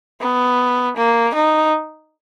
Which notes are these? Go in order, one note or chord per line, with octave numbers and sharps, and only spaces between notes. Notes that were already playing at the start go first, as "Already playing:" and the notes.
B3
A#3
D#4